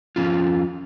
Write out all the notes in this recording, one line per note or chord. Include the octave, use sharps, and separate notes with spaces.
F2 D#3 C#4 F4